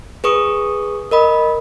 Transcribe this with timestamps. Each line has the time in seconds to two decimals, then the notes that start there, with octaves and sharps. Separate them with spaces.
0.24 G#4 B4 C#6 D#6
1.11 A#4 D#5 B5